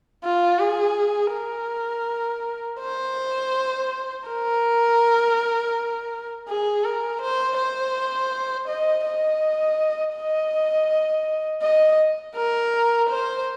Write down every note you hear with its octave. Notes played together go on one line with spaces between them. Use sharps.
F4
G#4
A#4
C5
A#4
G#4
A#4
C5
C5
D#5
D#5
D#5
D#5
A#4
C5